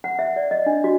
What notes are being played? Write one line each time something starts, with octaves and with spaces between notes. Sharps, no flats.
F#5
E5
D5
D#5
D4
F#4